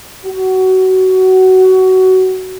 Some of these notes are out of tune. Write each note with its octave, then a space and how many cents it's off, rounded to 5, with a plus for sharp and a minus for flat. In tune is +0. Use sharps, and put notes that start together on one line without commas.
F#4 +20